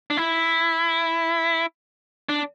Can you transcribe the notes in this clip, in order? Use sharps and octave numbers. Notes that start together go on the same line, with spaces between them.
D4
E4
D4